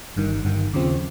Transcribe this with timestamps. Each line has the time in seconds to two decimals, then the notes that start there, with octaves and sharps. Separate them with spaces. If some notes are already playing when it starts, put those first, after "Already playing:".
0.16 G1 G2 D#3
0.45 G1 G2 D#3
0.74 D#2 C#3 F3 C4